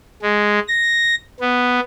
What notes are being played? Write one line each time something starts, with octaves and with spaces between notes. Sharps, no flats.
G#3
A#6
B3